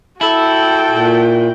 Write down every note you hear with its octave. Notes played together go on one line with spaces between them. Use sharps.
E4 F#4 A4 G5
A#2